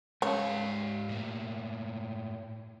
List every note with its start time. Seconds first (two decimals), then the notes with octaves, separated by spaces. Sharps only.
0.22 G#2 C#3 C#5 F5
1.09 A2 A#3